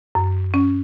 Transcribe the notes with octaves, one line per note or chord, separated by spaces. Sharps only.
F#2
C#4